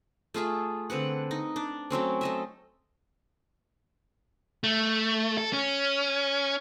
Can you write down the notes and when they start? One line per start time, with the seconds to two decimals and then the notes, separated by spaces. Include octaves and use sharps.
0.34 A3 F4 G#4 E5
0.90 D3 C4 B4 F#5
1.31 D#4
1.56 D4
1.90 F#3 A3 C4 C#4
2.21 A3 D#5 E5
4.64 A3
5.38 A4
5.53 C#4